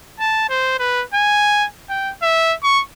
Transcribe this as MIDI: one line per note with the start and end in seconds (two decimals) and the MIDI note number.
0.20 0.46 81
0.49 0.78 72
0.79 1.03 71
1.14 1.66 80
1.89 2.12 79
2.22 2.54 76
2.63 2.82 85